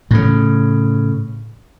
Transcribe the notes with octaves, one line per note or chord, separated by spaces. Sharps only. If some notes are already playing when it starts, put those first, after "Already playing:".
A2 C#3